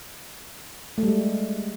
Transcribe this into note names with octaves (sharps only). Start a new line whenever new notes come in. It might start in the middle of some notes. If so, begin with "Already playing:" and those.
A3
G3
G#3